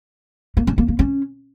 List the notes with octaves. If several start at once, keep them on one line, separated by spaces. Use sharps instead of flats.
A#3
C#4
A#3
A#3
C#4